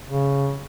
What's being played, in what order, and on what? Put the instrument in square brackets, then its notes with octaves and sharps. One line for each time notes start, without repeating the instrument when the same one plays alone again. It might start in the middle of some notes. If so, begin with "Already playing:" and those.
[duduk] C#3